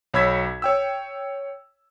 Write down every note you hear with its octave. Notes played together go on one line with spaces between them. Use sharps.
B1 C#5 B5 E6 G#6 B6
C#5 G5 E6